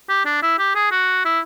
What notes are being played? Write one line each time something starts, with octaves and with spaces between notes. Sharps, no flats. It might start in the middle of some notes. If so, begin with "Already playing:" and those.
G4
D4
E4
G4
G#4
F#4
E4